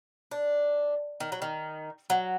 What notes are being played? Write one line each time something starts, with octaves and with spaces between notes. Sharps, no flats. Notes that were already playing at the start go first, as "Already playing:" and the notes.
D4
D#3
F#3
D#3
F#3